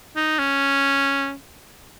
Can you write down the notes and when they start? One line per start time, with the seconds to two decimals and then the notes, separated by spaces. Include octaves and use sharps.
0.16 D#4
0.39 C#4